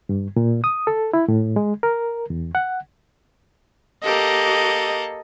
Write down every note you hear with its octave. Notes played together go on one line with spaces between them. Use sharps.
G2
A#2
D#6
A4
E4
A2
G#3
A#4
E2
F#5
A#3 G4 A4 D#5